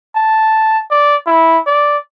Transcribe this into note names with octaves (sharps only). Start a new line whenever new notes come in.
A5
D5
E4
D5